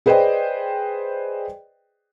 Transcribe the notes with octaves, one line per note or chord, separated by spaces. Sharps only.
G#4 B4 C5 D5 D#5 G5